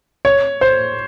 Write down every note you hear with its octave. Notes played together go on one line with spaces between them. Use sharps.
C#5
C5